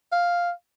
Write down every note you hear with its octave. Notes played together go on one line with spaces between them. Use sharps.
F5